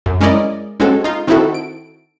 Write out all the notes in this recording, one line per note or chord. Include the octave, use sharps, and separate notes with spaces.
F#2
G#3 C#4 E4 A#4 D5 D#5
G#3 C4 C#4 F#4 A4
D#4 F4
D#3 C4 D#4 E4 F#4 A4
D7